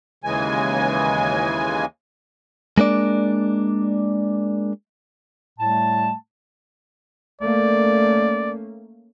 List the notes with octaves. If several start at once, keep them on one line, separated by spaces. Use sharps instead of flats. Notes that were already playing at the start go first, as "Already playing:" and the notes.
D#2 C#3 E3 G#3 G#5
G#3 A#3 D4 D5
A2 G3 A3 A5
A3 A#3 C#4 D5